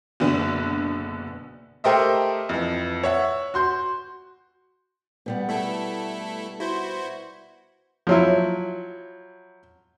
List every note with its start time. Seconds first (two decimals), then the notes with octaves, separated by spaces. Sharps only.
0.20 F#1 B2 D3 B3
1.84 A3 G4 A#4 C5 D#5 E5
2.49 F2 E3
3.03 C#5 E5 F#5
3.54 F#4 C6 G6
5.26 B2 G3 B3
5.49 A3 E4 A4
6.59 E4 F#4 C5
8.07 F3 F#3 E4